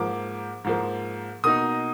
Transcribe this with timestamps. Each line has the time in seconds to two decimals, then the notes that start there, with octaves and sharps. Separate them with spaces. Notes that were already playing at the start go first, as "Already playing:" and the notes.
Already playing: G#2 F3 A#3 D6
0.64 G#2 F3 A#3
1.44 B2 A#3 D#4 D#6